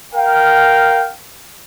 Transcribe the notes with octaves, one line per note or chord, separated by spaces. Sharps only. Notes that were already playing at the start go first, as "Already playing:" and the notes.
A#4 F5 G5